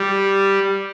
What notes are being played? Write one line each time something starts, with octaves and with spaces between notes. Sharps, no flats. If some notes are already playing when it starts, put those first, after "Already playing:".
Already playing: G3